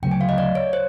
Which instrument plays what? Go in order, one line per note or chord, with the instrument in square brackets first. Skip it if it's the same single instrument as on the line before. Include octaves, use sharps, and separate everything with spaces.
[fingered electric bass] D2 C#3 F#3 A3 [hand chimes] G5
[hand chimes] G#5
F5
D#5
D5
C#5
C5